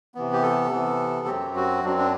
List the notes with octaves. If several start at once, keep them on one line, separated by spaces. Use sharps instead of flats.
C3 E3 B3
G4
A4
C3 E3 B3
F#2 F#3 C4 G4
F#4
F#2 F#3 C4 D4
D4